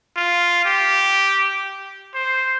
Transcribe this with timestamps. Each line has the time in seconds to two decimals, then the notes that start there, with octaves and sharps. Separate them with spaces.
0.16 F4
0.65 G4
2.14 C5